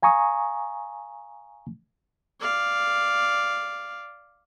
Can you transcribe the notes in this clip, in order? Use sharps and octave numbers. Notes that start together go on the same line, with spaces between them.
F5 G#5 A#5 C#6 D#6
D5 F5